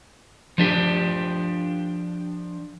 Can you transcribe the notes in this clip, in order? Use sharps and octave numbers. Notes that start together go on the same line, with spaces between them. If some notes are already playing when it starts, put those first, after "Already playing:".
F3 D4 G4